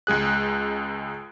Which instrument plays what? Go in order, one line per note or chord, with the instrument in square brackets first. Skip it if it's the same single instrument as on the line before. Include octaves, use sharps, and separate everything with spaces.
[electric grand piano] C#2 G#3 G#4 F#6